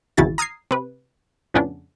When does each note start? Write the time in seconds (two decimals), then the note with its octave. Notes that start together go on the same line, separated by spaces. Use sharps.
0.17 G#1 E2 C#3 E4 F#4 A6
0.38 A#5 D#6 F6 G#6 C7
0.71 C3 B4
1.54 F2 A2 C#3 B3 C#4 D4